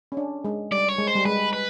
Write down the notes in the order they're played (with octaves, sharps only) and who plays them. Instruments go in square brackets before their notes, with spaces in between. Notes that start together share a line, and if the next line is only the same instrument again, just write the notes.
[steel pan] C#4
D4
G#3
[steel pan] G3 [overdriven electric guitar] D5
[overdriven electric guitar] C#5
[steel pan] G#3
[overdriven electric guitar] C5
[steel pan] G3
[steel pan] G#3 [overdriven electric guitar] B4
[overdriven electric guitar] B4